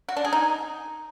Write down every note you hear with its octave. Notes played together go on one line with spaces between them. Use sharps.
F#4
D4
G#4
D#4